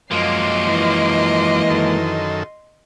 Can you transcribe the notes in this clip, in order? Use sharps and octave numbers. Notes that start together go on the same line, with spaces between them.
F#2 F3 G#3 A#3 D#5 C6 D6
E3
F#2 D#3 A4